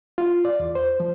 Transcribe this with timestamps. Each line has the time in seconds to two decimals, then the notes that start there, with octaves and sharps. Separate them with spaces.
0.18 F4
0.45 D5
0.60 E2
0.75 C5
1.00 F3